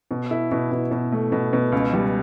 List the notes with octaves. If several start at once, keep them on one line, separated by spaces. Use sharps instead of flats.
B2
E4
B2
B2
B2
A3
B2
B2
C#2
G3